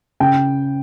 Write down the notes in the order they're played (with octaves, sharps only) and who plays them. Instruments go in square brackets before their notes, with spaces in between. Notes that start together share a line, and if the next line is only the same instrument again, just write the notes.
[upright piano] C#3 G5